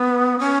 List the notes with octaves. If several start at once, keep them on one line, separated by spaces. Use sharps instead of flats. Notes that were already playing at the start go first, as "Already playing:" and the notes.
Already playing: B3
C#4